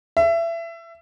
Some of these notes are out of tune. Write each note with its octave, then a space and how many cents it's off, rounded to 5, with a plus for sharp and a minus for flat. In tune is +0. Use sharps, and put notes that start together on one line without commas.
E5 +25